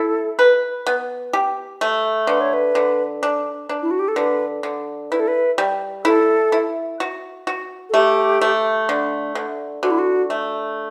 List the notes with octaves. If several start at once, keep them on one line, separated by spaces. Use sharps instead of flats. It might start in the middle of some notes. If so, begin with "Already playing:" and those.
Already playing: E4 A4
B4
B3
G4
A3
D3 B4
C#5
B4
D3
D4
D4
E4
F#4
G4
A4
D3 B4
D3
E4 B4
A4
B4
G3
E4 A4
E4
F#4
F#4
A4
A3 G4
A3
D3
D3
D3 F#4
E4
F#4
A3